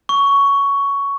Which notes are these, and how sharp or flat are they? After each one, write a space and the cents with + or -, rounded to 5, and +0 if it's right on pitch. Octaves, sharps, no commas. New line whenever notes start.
C#6 +10